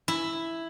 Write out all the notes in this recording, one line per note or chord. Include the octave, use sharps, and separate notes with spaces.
E4